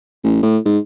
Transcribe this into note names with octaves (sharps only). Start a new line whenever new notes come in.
A1
A2
G#2